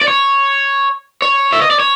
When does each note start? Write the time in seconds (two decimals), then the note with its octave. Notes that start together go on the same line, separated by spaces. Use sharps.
0.01 D5
0.08 C#5
1.22 C#5
1.53 E5
1.61 D#5
1.70 D5
1.79 C#5